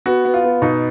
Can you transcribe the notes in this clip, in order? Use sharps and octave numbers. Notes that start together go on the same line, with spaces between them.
B3 F#4
B3
F4
B3
B2 D#4